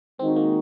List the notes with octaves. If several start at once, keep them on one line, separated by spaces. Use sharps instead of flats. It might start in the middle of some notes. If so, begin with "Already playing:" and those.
D#3 G#3 C4 D#4 F#4
A#3